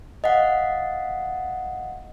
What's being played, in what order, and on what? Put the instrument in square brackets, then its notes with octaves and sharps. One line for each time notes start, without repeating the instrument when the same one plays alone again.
[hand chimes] D#5 F5 F#5